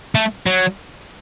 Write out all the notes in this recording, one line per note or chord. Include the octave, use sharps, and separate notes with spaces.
A3
F#3